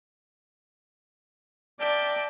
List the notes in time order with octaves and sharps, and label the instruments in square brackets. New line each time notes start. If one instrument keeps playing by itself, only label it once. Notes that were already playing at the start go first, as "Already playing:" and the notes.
[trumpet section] A#4 E5 G5 [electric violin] D5 A5